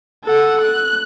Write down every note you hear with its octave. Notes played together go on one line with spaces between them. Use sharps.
A4 F#5
F#6